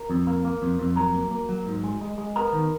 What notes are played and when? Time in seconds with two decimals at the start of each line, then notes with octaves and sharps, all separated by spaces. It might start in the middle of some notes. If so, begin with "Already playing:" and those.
Already playing: A#4
0.10 F2
0.27 A#3
0.45 A#3
0.62 F2
0.79 F2
0.96 F#3 A#4 A#5
1.14 A#3
1.31 A#3
1.49 F#3
1.66 G#2
1.84 G#3
2.01 G#3
2.18 G#3
2.36 B3 A#4 A#5
2.53 D#3